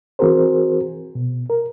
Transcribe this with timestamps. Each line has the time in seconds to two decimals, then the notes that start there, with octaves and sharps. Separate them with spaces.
0.19 E3 C4 F#4 G#4 A#4 C5
1.15 B2
1.50 A#4